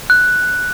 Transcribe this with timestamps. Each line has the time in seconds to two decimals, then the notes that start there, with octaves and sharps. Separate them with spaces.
0.10 F#6